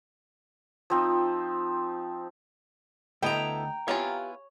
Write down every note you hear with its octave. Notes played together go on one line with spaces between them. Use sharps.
F3 C4 D#4
D2 B3 E4 A4 D#5 G5 A#5
B3 E4 F4 G4 C#5 F5 G#5